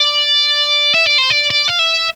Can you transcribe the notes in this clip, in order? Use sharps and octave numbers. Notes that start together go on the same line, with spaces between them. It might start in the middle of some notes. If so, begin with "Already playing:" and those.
Already playing: D5
E5
D5
C5
D5
D5
F5
E5